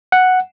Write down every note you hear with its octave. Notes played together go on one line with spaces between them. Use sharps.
F#5